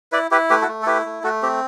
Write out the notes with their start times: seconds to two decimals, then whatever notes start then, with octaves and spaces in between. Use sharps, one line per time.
0.12 E4 B4 D5
0.31 E4 G4 B4
0.50 A3 G4 B4
0.62 F#4 A4
0.68 A3
0.82 A4
0.86 E4 G4 B4
1.06 A3
1.23 A3 F#4 A4
1.42 C4 G4